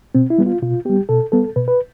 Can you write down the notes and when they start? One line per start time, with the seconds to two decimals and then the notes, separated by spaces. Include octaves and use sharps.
0.15 B2 C4
0.30 E4
0.38 G3 B3
0.46 F4
0.62 B2 F4
0.85 G3 B3 G4
1.09 B2 A4
1.32 G3 B3 A4
1.56 B2 B4
1.68 B4